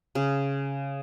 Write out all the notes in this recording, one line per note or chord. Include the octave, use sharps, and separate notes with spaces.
C#3